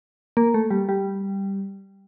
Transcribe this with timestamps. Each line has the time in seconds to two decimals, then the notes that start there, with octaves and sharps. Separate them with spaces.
0.37 A#3
0.54 A3
0.71 G3
0.89 G3